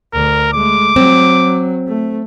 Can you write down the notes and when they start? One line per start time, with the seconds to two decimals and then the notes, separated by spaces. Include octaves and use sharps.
0.13 D2 A#4
0.53 G#3 A3 D6
0.96 F#3 C4
1.87 A3